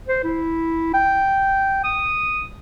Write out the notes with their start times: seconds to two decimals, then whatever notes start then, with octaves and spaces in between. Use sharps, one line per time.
0.08 C5
0.24 E4
0.94 G5
1.84 D#6